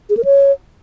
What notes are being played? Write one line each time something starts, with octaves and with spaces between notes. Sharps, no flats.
G#4
A#4
C#5